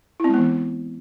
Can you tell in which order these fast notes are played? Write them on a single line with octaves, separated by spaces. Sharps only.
E4 C4 G#3 B3 E3